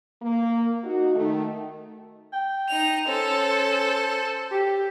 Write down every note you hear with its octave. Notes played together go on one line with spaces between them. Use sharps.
A#3
D#4 F#4
D#3 A3
G5
D#4 F7
C#4 A4 C5
G4